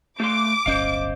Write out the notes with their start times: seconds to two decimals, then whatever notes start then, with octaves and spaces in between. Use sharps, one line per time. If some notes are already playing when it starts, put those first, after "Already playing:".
0.20 A3 F5 C6 D6
0.66 D1 G1 C#4 C5 D#5 F5